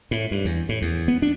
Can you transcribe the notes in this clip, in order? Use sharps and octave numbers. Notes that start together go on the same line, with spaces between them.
A2
G2
E2
A2
E2
B3
D4